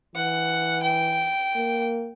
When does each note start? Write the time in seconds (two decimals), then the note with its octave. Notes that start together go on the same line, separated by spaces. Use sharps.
0.16 E3 F#5
0.83 G5
1.56 A#3